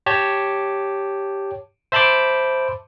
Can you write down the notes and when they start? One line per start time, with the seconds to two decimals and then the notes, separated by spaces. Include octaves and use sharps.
0.06 G4 C#5 A5
1.92 C5 E5 A5 B5 C6 D6